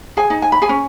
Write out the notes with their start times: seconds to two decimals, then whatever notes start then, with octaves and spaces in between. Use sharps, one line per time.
0.17 G#4 G#5
0.30 D#4
0.42 G#5
0.52 B5
0.62 G#4 G#5
0.69 C#4